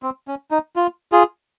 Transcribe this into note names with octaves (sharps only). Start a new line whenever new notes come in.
C4
C#4
D#4
F4
F4 G#4